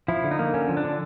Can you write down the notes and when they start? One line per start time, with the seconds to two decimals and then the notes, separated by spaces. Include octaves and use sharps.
0.08 F3 E4
0.24 D3
0.31 D#4
0.39 A#3
0.54 D3 C#4
0.69 F3
0.77 D4
0.84 D3